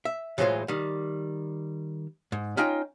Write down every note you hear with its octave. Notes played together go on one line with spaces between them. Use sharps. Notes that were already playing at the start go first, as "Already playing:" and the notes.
E5
A2 E3 F#3 G#3 F4 C5
D#3 G3
G#2
C#4 D#4 F4 D#5 G5